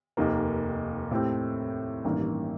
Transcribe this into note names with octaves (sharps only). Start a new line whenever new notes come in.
F1 D#2 D#3 A#3
A2 A3 C4 G4
A1 G2 D#3 A#3